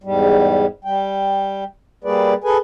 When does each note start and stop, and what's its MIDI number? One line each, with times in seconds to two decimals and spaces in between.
0.04 0.66 40
0.04 0.66 44
0.04 0.66 55
0.84 1.64 55
0.84 1.64 79
2.04 2.34 55
2.04 2.34 58
2.04 2.34 68
2.04 2.34 71
2.04 2.34 74
2.44 2.58 68
2.44 2.58 69
2.44 2.58 71
2.44 2.58 80